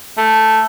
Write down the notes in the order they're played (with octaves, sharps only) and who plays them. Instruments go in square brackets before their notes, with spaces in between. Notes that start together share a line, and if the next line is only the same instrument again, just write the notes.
[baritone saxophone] A3